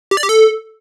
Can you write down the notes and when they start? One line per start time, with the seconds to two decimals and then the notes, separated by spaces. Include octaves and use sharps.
0.11 G4
0.17 D5
0.23 G4
0.29 A4